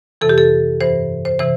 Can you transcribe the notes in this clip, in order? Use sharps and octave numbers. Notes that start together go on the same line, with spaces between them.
F2 C3 E3 A4
G4
A4
G2 E3 C5
C5
C3 E3 C5